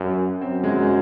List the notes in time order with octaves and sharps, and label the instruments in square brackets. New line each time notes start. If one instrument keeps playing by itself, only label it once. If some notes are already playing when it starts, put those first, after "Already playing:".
Already playing: [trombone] F#2
[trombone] F#2 [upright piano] C4
[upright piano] G#3
F#3